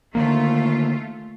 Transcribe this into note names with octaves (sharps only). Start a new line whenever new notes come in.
D3 D#3 A3 A#3 F4